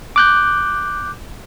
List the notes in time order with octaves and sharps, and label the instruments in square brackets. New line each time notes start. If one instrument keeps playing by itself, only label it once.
[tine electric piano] D6 F#6 G6